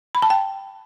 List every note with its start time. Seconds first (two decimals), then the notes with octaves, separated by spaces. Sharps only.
0.15 B5
0.22 A5
0.30 G5